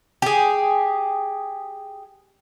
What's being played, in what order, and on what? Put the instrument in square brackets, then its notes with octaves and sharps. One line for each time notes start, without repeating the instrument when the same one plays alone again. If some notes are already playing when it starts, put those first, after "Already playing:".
[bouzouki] G4 G#4